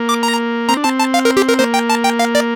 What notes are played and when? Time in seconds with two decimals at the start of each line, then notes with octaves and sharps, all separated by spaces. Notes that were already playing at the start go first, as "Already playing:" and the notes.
Already playing: A#3
0.09 D6
0.23 A#5
0.69 C4 A#5
0.77 D4
0.84 C4 A5
0.99 A5
1.14 F5
1.25 A#4
1.37 G4
1.49 A#4
1.59 A#3 C5
1.74 G5
1.90 A5
2.04 G5
2.19 F5
2.35 D5